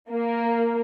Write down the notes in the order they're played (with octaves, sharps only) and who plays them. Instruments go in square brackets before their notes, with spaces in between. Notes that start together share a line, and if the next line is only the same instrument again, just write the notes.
[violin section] A#3